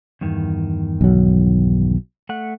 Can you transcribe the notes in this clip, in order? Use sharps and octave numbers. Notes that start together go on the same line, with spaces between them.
E2 G2 D#3
B1 F#3
A3 F#5